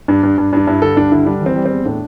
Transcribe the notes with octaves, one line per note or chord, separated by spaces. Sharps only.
G2 D4
G2
G2
G2 D4
G2 E4
D3 A4
G2 D4
D3 E4
G3 D4
E3
C4
G3
C4
E2
A2 D4